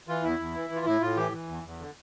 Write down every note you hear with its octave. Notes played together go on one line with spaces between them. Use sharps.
E3 F4
E2 E4
E2
E3
E3
F4
A2 E4
A2 F4
E3 G4
E3
E2
E2
D3